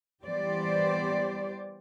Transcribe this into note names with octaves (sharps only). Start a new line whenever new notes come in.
E3 G3 B3 G4 C5 D5